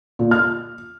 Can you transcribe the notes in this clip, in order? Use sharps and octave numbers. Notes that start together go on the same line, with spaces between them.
A#2
F6